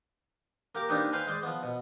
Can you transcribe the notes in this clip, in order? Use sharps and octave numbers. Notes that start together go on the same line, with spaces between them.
A#3 G4 A#4 D6
A#3 C4 D4 D#4 G4 B4
B4 C5 F5 G5 G#5 B5
G#3 C5 D5
F3 B3
B2